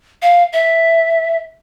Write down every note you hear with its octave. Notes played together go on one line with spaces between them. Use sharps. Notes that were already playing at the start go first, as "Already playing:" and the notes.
F5
E5